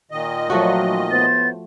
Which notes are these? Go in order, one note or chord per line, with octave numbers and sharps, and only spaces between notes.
A#2 D#3 D#5
F3 F#3 A3 F#4
A2 B3 C5 A6